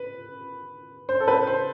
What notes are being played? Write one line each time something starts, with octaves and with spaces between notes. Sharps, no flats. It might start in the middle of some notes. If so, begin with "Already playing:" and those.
Already playing: B4
C5
A4
B4
C5